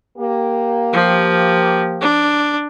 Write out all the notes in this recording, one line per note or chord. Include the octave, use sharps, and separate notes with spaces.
A#3 G4
F3
D4